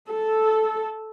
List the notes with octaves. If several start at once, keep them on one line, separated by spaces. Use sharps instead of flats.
A4